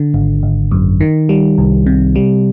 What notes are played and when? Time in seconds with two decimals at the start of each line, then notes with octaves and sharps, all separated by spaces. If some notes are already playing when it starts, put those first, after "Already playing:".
Already playing: D3
0.14 G#1
0.43 G#1
0.72 F#2
1.01 D#3
1.29 G3
1.58 C2
1.86 C3
2.16 G3